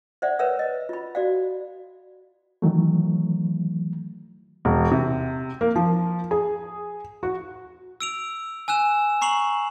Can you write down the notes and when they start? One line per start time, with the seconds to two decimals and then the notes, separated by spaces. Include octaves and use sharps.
0.22 C5 D5 E5 F#5
0.39 A#4 B4 C#5 E5 F#5 E6
0.59 D#5
0.89 F4 B5
1.15 F#4 D5 F5
2.62 D#3 E3 F#3 A3
4.65 E1
4.91 C3
5.61 A#3
5.76 F3
6.31 G#4
7.23 F#4
8.01 E6 D7 F7
8.68 G#5 E6 F#6 E7
9.21 A#5 C#6 C7 F7 F#7